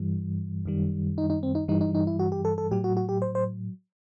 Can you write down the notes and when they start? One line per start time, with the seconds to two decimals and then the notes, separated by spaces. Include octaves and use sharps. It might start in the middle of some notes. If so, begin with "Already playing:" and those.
Already playing: G2 E3 G3
0.65 F#2 D#3 G3
1.18 D#4
1.30 D#4
1.43 C4
1.55 D#4
1.68 G2 E3 G3 D#4
1.81 D#4
1.95 D#4
2.07 E4
2.19 F#4
2.32 G4
2.45 A4
2.58 A4
2.71 A2 F#3 G4
2.84 F#4
2.97 F#4
3.09 G4
3.22 C5
3.35 C5